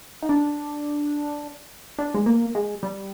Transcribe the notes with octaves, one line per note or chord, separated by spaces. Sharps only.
D#4
D4
D4
G#3
A#3
G#3
G3